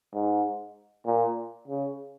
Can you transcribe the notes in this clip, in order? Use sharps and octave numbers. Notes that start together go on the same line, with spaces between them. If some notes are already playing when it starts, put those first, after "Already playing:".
G#2
A#2
C#3